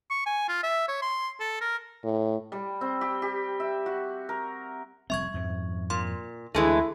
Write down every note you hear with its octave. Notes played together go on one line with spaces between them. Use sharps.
C#6
G#5
F4
E5
C#5
C6
A4
A#4
A2
G3
C4
G4
G4
E5
F#4
A#4
F1 G3 C4 E5 C#6 G#6
F2 G#2 F3
A#2 C6
D2 E3 G#3 A3 E4 G#4 A4